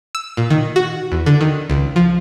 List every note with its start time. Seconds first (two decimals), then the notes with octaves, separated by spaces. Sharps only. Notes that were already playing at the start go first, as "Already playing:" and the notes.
0.15 E6
0.37 A#2
0.50 D#3
0.76 F#4
1.12 E2
1.26 D3
1.41 D#3
1.70 C#2
1.96 F3